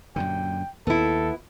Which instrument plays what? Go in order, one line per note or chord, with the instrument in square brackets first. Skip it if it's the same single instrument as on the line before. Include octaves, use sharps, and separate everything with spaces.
[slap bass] F#2 A#2 D3 [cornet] G5
[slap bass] D#2 [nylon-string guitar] B3 E4 [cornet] A4